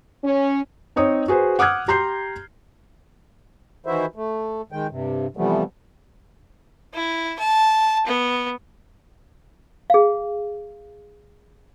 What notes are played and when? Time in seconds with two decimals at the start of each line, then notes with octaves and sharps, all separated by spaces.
0.24 C#4
0.96 C4 D#4 C#5 D#6
1.28 F#4 G#4 B4 C5
1.59 F#5 D6 D#6 F6 F#6 G#6
1.88 G4 A#5 C6 G6 C7
3.86 D#3 E3 E4 F#4 C5 E5
4.16 A3
4.72 D#3 G#3 G5
4.91 G2 C3
5.37 C3 E3 F3 G3 A3 B3
6.94 E4
7.39 A5
8.07 B3
9.90 G#4 F5